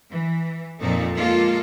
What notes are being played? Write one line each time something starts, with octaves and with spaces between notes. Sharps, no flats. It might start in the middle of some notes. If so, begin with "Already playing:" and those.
E3
F2 A#2 A#3 C4 D#4 A4
G#3 A#3 F4 A4